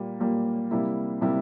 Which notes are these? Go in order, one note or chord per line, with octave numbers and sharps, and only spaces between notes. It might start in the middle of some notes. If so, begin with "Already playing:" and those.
Already playing: A#2 G3 A#3
A#2 G3 A#3
C3 G3 A#3 E4
C3 G3 A#3 E4